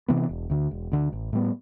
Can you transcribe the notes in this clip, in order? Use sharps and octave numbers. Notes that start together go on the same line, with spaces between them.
C3 E3 B3
E1
D2 D3
E1
D2 D3
A1
A2 G3 B3